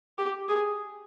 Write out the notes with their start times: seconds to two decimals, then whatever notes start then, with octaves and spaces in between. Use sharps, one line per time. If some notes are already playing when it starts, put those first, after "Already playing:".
0.18 G4
0.48 G#4